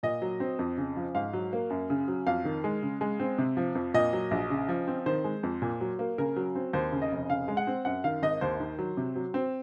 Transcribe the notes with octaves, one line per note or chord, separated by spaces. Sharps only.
A#2 D#5
F#3
C4
F2
C#3
F3
G#2 F5
F#3
A#3
F#2
C#3
F#3
F2 F5
D#3
G#3
C#3
G#3
C4
C3
F3
F2
A#2 D#5
F#3
A#1
C#3
F3
C4
D#3 C5
G#3
F2
A#2
F#3
A#3
C#3 A#4
F#3
C4
D#2 C5
C#3
D#5
F1
C#3 F5
G#3
F#5
C4
F#2 F#5
D#3 F5
G#1 D#5
D#2 C5
D#3
F#3
C3
F#3
C4